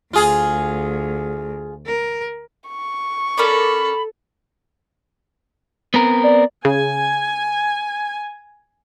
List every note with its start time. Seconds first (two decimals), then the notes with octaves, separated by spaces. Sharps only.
0.13 D2 F4 G#4
1.86 A#4
2.68 C#6
3.37 C#4 A4 A#4 D5 B5
5.94 B3 C4 A#4
6.24 D5
6.65 C#3 G#5